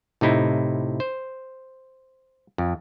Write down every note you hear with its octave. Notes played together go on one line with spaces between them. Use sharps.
A2 C3 D#4 E4
C5
F2